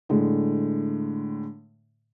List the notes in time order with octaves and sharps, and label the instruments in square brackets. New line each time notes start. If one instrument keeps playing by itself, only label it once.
[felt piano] A2 D3 G#3